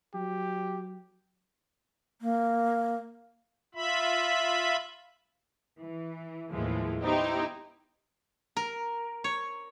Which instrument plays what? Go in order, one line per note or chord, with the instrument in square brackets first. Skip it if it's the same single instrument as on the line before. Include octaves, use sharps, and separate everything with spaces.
[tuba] F#3 [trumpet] G4
[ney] A#3
[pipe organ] F4 E5 B5
[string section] E3
D#2 A2 E3 F3 G#3
B3 D#4 E4 G4 C5
[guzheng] A#4
C#5